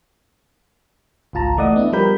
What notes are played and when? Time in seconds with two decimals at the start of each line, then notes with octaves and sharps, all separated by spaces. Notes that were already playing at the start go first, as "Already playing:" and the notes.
1.33 G#1 C#2 F4 A5 A#5
1.57 E3 A3 D5 D#5 F#5 D#6
1.76 B3 D4 E4
1.92 F3 G3 G4 A#4 B5 G6